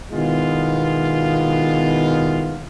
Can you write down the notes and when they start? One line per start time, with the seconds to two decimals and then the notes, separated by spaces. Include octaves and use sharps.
0.13 B2 D#3 G#3 B3 E4 F4